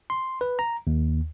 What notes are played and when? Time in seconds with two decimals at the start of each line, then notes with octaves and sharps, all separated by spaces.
0.10 C6
0.41 B4
0.59 A#5
0.87 D#2